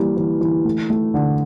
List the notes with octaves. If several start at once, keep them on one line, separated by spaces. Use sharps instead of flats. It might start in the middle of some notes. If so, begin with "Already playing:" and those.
Already playing: E3 G3 A#3
E3
E3
A3
A3
D3